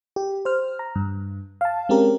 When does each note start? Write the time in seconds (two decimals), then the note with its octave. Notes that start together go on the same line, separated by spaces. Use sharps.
0.16 G4
0.45 C5 F6
0.79 A#5
0.95 G2
1.61 F5 A5
1.89 G#3 C4 C#4 G4 A#4